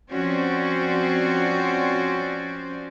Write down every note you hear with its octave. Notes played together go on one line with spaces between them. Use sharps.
F3 C4 C#4 F#4 C5 D5